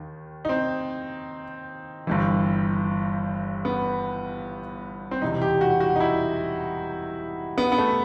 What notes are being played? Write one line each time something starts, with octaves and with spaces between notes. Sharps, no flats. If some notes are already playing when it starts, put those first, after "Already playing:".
Already playing: D#2 D#3
D#4
C4
G1 G2 E3
B3
C4
E1 E2 C3 E3 D#4
G4
F#4
F#4
D#4
E4
B3
B3
A3